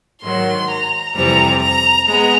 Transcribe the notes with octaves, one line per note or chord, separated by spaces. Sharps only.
G#2 D#3 F#3 C6
A#5
F2 C3 E3 G3 C4 A#5
A#5
G#3 B3 A#5